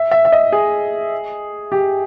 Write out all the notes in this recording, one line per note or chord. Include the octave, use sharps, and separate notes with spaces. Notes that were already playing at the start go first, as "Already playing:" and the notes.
Already playing: E5
E5
E5
D#5
G#4
G4